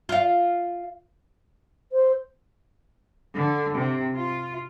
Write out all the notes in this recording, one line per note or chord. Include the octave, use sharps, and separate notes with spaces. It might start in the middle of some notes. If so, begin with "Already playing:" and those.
F4 F5
C5
D3
C3
F4